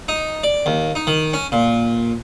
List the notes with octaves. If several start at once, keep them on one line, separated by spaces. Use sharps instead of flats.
D#4
D5
D#2
D#4
D#3
C#4
A#2